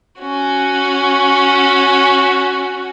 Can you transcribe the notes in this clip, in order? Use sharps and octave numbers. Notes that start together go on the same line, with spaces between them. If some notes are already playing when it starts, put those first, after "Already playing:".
C#4 F#4